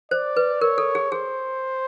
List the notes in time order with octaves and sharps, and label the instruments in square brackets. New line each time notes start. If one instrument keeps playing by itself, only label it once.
[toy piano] C5 [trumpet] D5
[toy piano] B4
[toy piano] A#4 [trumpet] C#5
[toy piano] A4
G#4
[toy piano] G#4 [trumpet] C5